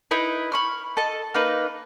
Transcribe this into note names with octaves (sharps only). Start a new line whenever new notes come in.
D#4 E4 B4
B5 C#6 F6
A4 D#5 A5
A#3 D#4 B4